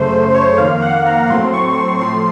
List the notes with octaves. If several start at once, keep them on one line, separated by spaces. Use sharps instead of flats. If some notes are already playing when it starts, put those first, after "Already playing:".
Already playing: F#2 C#3 A3 C5
C5
C5
C#5
F2 D#3 A#3 F5
F#5
A#5
A2 F#3 A3 C4 C6
C#6
C#6
C#6
A2 F3 A3 C6